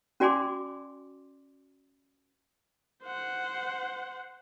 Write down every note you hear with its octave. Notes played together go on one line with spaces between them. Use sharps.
C#4 F#4 D5 G#5 C6 D6
C5 F#5